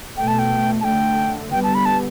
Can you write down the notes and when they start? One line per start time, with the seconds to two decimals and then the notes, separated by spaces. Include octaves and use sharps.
0.17 B2 A3 G5
0.28 A5
0.39 G5
0.80 A5
0.84 D3 A3 G5
1.52 D3 G3 B3 G5
1.63 A5
1.75 B5
1.86 A5